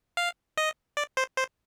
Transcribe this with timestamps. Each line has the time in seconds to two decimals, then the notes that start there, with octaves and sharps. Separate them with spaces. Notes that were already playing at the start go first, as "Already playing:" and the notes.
0.17 F5
0.57 D#5
0.97 D5
1.17 C5
1.37 C5